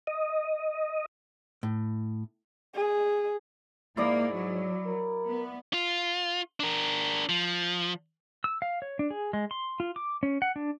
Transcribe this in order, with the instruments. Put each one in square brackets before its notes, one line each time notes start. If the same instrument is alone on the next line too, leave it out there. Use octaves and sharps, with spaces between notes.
[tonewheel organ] D#5
[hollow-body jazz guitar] A2
[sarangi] G#4
[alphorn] G#2 [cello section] A#3 [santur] E4 D5 D#6
[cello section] F#3
[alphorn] A#4
[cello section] B3
[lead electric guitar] F4
D4 A#4
F3
[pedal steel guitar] E6
F5
C#5
D4
G#4
G#3
C6
F4
D6
C#4
F#5
D4